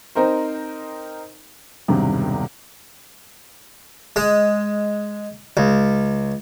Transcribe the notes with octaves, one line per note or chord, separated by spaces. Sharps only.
C4 D#4 A#4 C5
E1 C2 G2 C3 D#3
G#3
C#2